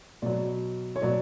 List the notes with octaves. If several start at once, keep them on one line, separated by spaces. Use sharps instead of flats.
B2 F#3 D5
C#5
B2 F#3 D5